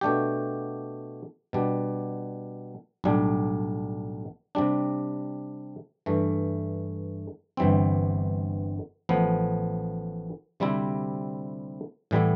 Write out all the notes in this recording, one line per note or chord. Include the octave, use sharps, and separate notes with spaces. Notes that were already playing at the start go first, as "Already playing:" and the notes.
B2 A3 D4 G4
B2 G3 D4
B1 A2 G3 D4
C3 G3 D4
G2 E3 A3
G1 G2 E3 G3 C4
A1 A2 F3 B3
D2 C3 G3 C4 E4
A2 E3 G3 B3 E4